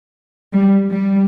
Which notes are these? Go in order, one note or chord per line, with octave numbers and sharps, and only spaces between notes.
G3
G3